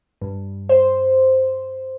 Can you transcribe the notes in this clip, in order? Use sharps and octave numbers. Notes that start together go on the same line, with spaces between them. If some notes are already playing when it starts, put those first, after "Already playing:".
G2
C5